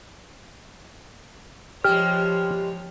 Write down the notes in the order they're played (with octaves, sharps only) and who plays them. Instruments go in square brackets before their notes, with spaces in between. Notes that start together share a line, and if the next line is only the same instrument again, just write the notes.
[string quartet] F3 C#5 [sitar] G3 G#3 [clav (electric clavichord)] G4 [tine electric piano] F6